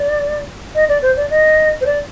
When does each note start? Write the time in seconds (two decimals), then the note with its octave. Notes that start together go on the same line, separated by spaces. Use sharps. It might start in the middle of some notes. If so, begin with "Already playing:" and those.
Already playing: D5
0.75 D#5
0.89 D5
1.02 C5
1.17 D5
1.30 D#5
1.81 C5
1.86 D5